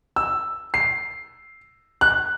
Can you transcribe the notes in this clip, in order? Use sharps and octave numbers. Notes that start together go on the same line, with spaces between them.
E6
C7
F#6